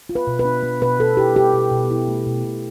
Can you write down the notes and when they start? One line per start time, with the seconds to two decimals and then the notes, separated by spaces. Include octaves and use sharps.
0.09 F4
0.15 B4
0.27 B2
0.39 B4
0.45 D4
0.63 B3
0.81 B2 B4
0.99 B2 A4
1.17 E4 G4
1.35 B3 G4
1.54 B2
1.71 B2
1.90 E4
2.08 A3
2.26 B2
2.44 B2